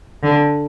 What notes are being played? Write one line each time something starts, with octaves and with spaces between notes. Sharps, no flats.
D3